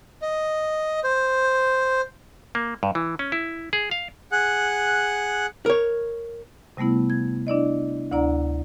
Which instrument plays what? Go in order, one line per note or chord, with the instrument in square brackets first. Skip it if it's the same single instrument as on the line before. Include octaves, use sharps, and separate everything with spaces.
[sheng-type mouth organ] D#5
C5
[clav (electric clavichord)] A#3
G2
E3
C#4
E4
G#4
F5
[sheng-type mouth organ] G#4 F#5 F#6
[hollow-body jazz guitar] A#4 C#5
[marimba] C3 G3 A3 B3 E4
G#6
D4 E4 D5 D#5
D2 D4 E4 D5 F#5 A#5